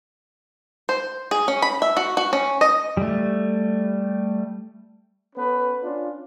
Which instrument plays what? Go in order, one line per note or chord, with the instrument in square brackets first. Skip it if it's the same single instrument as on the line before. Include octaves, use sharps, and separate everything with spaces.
[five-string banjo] C5
G#4
C#4
B5
E5
F#4
F#4
C#4
D#5
[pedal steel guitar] G3 A3
[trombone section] B3 C#4 A4 B4
C#4 D4 F4